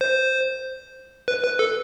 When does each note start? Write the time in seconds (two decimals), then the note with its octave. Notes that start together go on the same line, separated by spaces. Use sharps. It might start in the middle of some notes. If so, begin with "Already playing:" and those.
0.01 C5
1.28 B4
1.44 B4
1.59 A4